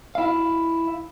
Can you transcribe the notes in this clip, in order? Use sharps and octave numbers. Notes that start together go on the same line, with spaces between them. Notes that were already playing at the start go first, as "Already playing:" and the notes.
E4 F5